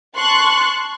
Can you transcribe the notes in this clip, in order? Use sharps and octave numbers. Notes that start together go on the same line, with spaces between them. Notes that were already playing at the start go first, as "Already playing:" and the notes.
A5 C6 C#6 F#6